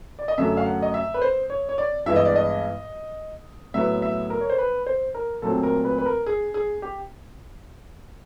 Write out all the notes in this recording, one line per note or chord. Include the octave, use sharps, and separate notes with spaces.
D5
D#5
F#2 D3 F#3 A3 E5
F5
F#5
D#5
E5
B4
C5
C#5
C#5
D5
G2 E3 G#3 B3 E5
D#5
D5
D#5
A2 F#3 B3 E5
E5
A#4
C#5
C5
B4
C5
A#4
A#2 F#3 A3 C4 A4
A#4
B4
B4
A#4
G#4
G#4
G4